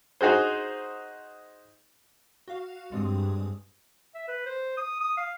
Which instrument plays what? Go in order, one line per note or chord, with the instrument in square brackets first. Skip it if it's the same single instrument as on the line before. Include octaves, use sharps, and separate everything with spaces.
[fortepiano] D#4 F#4 G#4 C5
[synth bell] F#4 F5
[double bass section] G2 [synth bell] G#3 C4 D#6
[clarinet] E5
B4
C5
D#6
D#6
F5